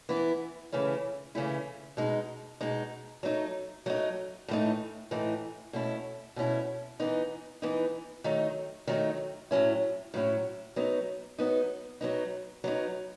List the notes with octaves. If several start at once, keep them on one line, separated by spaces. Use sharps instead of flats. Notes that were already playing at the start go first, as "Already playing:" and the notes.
E3 B3 E4
C#3 E3 A3 C#4 E4
C#3 E3 A3 C#4 E4
B2 G#3 D#4
B2 G#3 D#4
F#3 A3 D#4
F#3 A3 D#4
A2 E3 A3 D#4
A2 E3 A3 D#4
B2 A3 C#4 E4
B2 A3 C#4 E4
E3 B3 D#4
E3 B3 D#4
D#3 F#3 A3 D#4
D#3 F#3 A3 D#4
A2 F#3 C#4 E4
A2 F#3 C#4 E4
F#3 B3 D#4
F#3 B3 D#4
F#3 B3 D#4
F#3 B3 D#4